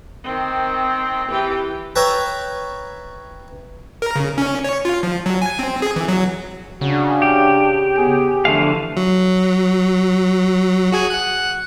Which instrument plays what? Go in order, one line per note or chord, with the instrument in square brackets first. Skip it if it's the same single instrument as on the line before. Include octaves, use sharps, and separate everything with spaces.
[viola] D#3 C4
E3 G4
[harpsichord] B4 C#5 E5 G5 A5 A#5
[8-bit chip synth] A#4
C#3
C#4
C#5
F4
F3
F#3
G#5
C4
G#4
E3
F#3
[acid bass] C#3 [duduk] D4 [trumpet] F#4
[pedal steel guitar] G4
[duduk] B3 [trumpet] G#4
[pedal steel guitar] D3 E3 F5 [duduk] F3 [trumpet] A3
[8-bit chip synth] F#3
F#4 G#4 G#5
F#5 F#6